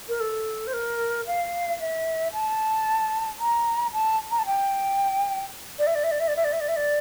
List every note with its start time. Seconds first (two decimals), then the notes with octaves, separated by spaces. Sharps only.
0.09 A#4
0.20 A4
0.67 C5
0.73 A#4
1.27 F5
1.80 E5
2.33 A5
3.39 A#5
3.93 A5
4.31 A#5
4.39 A5
4.46 G5
5.79 D5
5.87 E5
5.95 D5
6.04 E5
6.11 D5
6.20 E5
6.28 D5
6.36 E5
6.44 D5
6.53 E5
6.60 D5
6.68 E5
6.76 D5